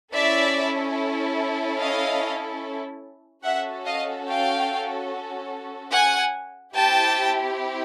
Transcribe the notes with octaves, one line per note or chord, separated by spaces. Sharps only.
C#4 E4 A4 D5 E5
D#5 F5
C#4 F#4 A4 E5 F#5
D#5 F5
F5 G5
F#5 G#5
C4 E4 G4 G5 A5